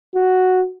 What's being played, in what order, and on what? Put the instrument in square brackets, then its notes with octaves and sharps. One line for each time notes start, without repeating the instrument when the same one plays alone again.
[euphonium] F#4